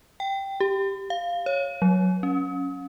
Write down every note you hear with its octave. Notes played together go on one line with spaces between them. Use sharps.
G5
G4
F5
C#5
F#3
C#4